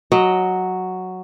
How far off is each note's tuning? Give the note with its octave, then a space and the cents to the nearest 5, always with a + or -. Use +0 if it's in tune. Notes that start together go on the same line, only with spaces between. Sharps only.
F#3 +0 D#5 +0